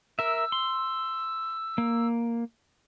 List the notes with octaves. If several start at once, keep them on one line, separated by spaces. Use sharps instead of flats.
A#4 E5 E6
C6
A#3